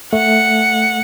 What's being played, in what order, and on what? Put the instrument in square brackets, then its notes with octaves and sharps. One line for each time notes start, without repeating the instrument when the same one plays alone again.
[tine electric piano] A3 [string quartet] F#5